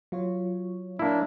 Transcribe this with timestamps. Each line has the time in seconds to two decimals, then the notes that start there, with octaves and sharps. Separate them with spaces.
0.12 F#3 F4 C#5
0.99 A#3 D4 E4